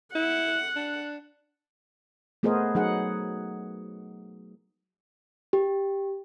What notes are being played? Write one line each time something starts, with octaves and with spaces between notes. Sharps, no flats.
E4 F#5
D4
A3 B3 G#4 A#4 C5 D#5
F#3 D#4 G#4 F#5
G4